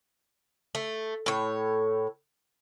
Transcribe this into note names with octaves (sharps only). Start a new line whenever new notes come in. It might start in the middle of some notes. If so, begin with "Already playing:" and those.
A3
A2 C#5